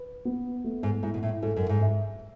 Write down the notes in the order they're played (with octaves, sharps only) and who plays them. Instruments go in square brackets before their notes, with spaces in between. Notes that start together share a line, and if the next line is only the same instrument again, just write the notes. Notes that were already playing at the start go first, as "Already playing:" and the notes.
Already playing: [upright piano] B4
B3
A3
[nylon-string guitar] G#2
[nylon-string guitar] G#2 [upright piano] E4
[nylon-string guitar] B2
A2
[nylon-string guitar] G#2 [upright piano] A4
[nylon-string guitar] F#2
G#2
[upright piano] E5